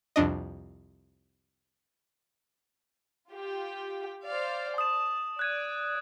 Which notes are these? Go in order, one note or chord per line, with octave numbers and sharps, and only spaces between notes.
C2 F2 D4 D#5
F4 G4
C5 D5 F5
A5 D#6 E7
D5 F#6 G#6 D#7